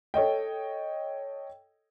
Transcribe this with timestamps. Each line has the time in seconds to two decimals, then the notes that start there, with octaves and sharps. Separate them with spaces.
0.14 A4 C#5 D#5 G5